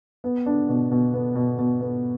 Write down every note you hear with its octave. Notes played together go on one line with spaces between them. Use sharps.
B3
D4
B2
B2
B3
B2
B2
B3